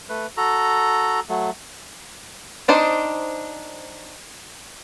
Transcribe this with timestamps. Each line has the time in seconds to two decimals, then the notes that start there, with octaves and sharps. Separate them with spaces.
0.09 A3 B4
0.37 F#4 A4 A#5
1.29 F#3 A3
2.68 C4 D4 D#4 C5